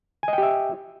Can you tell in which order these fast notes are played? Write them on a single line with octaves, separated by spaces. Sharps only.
G#5 D#5 G5 G4 E5